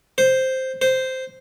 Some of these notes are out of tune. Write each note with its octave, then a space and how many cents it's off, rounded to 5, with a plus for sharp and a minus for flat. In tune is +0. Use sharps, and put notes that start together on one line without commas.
C5 +0
C5 -5